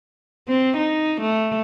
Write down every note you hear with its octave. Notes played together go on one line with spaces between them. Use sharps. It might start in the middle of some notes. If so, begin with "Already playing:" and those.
C4
D#4
A3